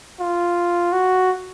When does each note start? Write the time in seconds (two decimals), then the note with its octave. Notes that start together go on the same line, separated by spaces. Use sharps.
0.20 F4
0.92 F#4